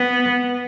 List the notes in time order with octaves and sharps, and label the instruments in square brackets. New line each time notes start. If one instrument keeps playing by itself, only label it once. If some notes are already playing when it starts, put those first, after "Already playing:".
Already playing: [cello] B3